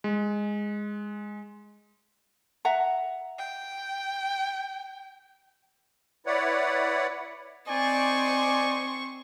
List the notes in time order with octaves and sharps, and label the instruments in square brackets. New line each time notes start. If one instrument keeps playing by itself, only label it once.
[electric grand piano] G#3
[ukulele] E5 F#5 A#5
[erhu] G5
[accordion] E4 B4 C#5 D5 F#5
[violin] C4 C#6 [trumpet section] D#4 D5 G#5